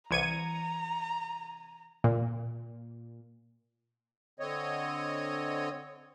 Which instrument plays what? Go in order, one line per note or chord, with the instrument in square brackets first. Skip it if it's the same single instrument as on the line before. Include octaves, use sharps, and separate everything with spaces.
[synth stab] C2 G#6 D#7 [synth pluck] E3 C#7 [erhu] A#5
[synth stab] A#2
[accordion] D3 C4 C#5 D#5